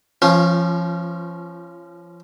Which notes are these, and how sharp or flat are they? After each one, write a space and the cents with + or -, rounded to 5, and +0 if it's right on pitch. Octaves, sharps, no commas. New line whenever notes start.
F3 -30 C#4 -20 F4 +0